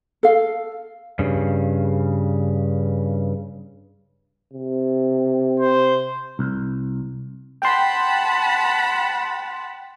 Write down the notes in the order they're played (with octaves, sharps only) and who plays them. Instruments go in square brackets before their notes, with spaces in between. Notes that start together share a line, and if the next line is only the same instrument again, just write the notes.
[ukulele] A4 F5
[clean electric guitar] G2 C#3
[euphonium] C3
[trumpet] C5
[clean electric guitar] C2
[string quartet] F#5 A5 B5 [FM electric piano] G5 C6